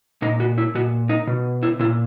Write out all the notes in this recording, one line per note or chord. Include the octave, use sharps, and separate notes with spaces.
A#2 D#4
F#4
E4
A#2 F#4
D#4
B2
E4
A#2 E4